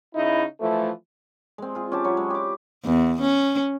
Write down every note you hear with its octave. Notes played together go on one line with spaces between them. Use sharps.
C#3 D#4 E4
E3 F3 A3
G#3 C4
F4 G#4
C#4 G4 A5
F#3 E4 C#5
G#3
G4 D6
E2
C#4